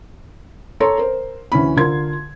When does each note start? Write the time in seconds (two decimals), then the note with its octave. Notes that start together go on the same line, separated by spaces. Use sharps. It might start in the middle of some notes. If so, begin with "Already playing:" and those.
0.80 A4 C#5 A#5 C6
0.98 A#4 C5
1.52 D2 E3 C#4 B5
1.77 D3 F4 A#4 C6 G#6